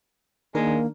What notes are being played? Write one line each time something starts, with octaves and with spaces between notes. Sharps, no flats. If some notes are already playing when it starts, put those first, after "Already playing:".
D#3 G#3 A#3 D4 A#4